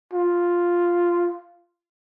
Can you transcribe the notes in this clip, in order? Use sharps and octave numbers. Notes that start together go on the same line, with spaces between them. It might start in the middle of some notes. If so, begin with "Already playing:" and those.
F4